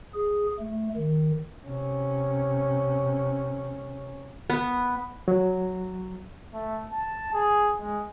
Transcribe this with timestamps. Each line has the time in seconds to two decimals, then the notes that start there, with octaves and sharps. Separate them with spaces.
0.14 G#4
0.59 A3
0.96 D#3
1.65 C3 C#4
4.50 B3
5.28 F#3
6.54 A3
6.92 A5
7.33 G#4
7.81 G#3